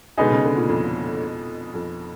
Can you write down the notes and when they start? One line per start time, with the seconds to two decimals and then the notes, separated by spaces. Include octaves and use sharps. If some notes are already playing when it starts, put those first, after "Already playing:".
0.17 B2 D3 G#3 B3 D#4 G#4
0.31 C#3
0.44 D3
0.57 A#2
0.69 F2
1.75 F2